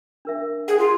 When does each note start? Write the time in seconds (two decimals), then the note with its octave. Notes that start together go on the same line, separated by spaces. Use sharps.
0.25 D4 A#4 E5
0.68 G#4 C5 D5 F#5
0.79 F4